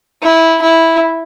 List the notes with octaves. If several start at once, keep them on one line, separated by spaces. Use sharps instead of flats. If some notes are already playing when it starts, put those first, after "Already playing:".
E4
E4